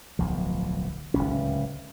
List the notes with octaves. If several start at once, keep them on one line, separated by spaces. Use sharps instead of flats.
D1 B1 F3
D1 G#1 C#2 C#4